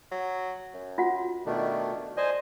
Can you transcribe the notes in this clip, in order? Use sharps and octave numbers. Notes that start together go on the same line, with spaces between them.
F#3
F#2
F4 F#4 F#5
B2 D#3 A3 D4
C5 D5 D#5 G#5